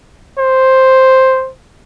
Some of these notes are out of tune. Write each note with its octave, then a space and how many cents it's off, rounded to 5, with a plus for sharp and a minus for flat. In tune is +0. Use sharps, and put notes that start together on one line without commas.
C5 +5